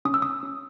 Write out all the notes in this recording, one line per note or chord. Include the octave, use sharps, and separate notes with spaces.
C#4 D#6
E6
D#6
C#4